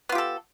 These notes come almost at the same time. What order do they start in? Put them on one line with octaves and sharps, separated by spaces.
B3 F4 G4 A4